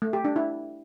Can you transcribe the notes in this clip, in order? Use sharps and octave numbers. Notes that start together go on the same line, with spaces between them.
A3
G4
D4
E4